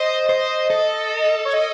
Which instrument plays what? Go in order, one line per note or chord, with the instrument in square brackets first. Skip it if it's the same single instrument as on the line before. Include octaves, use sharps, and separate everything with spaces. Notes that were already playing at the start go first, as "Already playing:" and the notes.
Already playing: [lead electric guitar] C5 [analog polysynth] D#5
[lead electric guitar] C5
A4
[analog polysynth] C#5
D#5